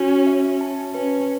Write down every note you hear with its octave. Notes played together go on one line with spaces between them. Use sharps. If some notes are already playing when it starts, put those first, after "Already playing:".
Already playing: C#4 F#4
E5
A5
C#4 B4